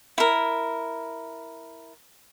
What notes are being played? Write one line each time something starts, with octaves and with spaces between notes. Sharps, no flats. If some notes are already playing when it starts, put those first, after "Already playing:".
E4 A#4